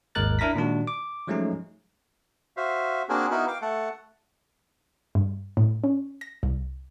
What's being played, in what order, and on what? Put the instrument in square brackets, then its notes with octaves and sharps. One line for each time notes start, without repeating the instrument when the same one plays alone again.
[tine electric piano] G#1 D#2 G#3 A#4 F#6 A6
D4 E4 A#4 A#6 B6
A#2 D#3 G#3 D4 F#4
D6
F3 F#3 G#3 A3 C#4 D#4
[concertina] F#4 C5 E5 F5
A#3 C4 D4 F#4 G#4 A#4
B3 D#4 E4 F#4 A#4 B4
F5 G5 D6
A3 A4 F#5
[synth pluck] G2
A2
C#4
A#6
C2